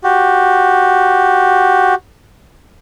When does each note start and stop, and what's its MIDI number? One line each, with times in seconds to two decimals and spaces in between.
0.04 1.95 66
0.04 1.95 67